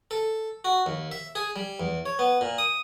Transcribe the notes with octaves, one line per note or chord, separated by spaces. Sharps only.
A4
F#4
D#2
E5
G#4
G3
E2
C#5
B3
A#2
D#6